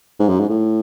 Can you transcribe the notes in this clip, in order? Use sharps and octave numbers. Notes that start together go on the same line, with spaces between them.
G#2
F#2
G#2
A2